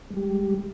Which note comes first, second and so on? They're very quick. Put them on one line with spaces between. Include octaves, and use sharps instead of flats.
G#3 G3 G4